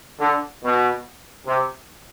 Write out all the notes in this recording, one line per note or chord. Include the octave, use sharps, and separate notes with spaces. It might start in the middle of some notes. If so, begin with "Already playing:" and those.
D3
B2
C3